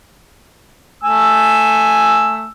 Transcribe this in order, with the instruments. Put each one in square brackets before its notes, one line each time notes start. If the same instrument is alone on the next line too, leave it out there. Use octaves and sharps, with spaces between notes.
[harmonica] A3 G#5 E6